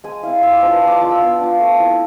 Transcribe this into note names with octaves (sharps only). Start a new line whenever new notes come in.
G#3 G#5
C4 E4 F5
G#3 E5
D5
D4 F4 C5
B4
G#3 A5
C6 D6
D4 F4 D6
E6
B3
D4 F4
A3
C4 E4